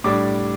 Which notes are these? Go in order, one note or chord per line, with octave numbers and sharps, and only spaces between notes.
A2 G3 D4 D6